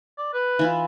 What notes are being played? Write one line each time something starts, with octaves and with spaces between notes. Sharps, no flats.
D5
B4
E3 E4 F4